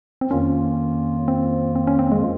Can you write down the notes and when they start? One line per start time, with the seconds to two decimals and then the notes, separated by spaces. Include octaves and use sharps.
0.21 C4
0.30 F2 D#3 A#3 C#4 F4
1.28 C4
1.75 C4
1.87 C#4
1.99 C4
2.12 G#3